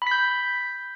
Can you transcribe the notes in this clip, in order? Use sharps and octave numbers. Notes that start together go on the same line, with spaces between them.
B5 G6 B6